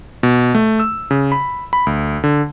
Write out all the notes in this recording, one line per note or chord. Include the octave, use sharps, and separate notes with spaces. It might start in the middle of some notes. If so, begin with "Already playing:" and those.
B2
A3
E6
C#3
B5
B5
D2
D3